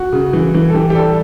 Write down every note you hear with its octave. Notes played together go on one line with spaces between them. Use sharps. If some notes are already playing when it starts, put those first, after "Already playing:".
Already playing: F#4
C#3
E3
E3
A4
E3 G4
G4
G3 A4